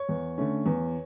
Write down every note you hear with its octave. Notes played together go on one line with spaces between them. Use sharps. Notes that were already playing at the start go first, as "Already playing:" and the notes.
Already playing: C#5
E2
D3 A3 C#4
E2